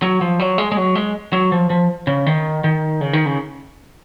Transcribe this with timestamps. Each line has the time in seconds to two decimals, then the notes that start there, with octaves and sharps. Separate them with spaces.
0.02 F#3
0.21 F3
0.39 F#3
0.58 G#3
0.72 G#3
0.77 F#3
0.95 G#3
1.33 F#3
1.52 F3
1.70 F3
2.07 C#3
2.26 D#3
2.64 D#3
3.01 C#3
3.13 D#3
3.26 C#3